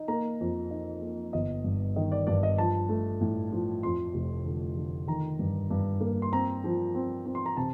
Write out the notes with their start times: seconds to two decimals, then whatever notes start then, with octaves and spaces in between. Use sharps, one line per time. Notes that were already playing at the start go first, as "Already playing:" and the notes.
Already playing: D#4
0.08 A#3 A#5
0.41 F2
0.71 D#4
1.02 A#3
1.33 G1 D#5
1.64 G2
1.96 D#3 D#5
2.12 D5
2.27 G2 D5
2.43 D#5
2.58 F3 A5
2.89 A3
3.21 A2
3.51 F3
3.83 F2 C6
4.14 F1
4.46 D3
4.77 D3
5.07 D#3 A#5
5.39 G2
5.71 G2
6.01 A#3
6.22 C6
6.32 C4 A#5
6.64 F3
6.95 C4
7.26 C4
7.35 C6
7.46 A#5
7.57 C3 A5